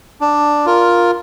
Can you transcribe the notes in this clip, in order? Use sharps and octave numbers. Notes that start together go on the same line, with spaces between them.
D4
F4 A#4